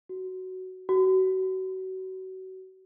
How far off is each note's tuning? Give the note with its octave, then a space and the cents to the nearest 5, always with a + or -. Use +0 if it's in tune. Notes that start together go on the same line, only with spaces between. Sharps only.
F#4 +10
F#4 +30